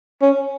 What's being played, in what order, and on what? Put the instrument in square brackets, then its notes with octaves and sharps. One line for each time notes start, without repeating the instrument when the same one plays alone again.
[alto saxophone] C#4